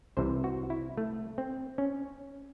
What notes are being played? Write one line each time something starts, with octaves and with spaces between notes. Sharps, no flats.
C2 C3 E3 C5
F#4
E4
A3
C4
C#4